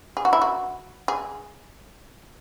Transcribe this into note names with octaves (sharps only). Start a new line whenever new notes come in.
G#4
F#4
E4
F#4
G#4